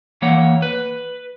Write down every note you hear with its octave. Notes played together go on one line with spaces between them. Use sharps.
E3 A#3 C#5 F#5
B4